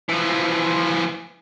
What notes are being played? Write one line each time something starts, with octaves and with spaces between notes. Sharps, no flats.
E3 F3